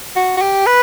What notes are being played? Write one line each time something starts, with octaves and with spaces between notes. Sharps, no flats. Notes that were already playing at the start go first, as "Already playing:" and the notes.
F#4
F#4
G4
B4